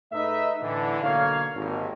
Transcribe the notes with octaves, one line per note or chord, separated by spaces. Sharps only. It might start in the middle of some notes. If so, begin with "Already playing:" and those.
G#2 A3 D#4 B4 D#5 E5
A2 D3 E3
B1 D3 A#3 C#5 F5
G#1 D#2